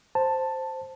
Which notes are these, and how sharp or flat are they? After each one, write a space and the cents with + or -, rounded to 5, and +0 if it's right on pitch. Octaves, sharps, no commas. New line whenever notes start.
C5 +0 A5 +5